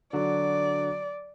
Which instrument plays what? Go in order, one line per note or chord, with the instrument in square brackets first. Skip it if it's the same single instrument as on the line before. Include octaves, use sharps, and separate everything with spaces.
[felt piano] D3 F#3 F#4 [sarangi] D5